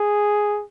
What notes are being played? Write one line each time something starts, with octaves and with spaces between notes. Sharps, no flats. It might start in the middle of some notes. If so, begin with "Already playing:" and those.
Already playing: G#4